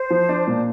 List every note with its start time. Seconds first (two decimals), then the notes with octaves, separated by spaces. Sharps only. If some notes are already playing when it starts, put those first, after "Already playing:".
Already playing: C5
0.10 F3
0.29 D4
0.47 A#2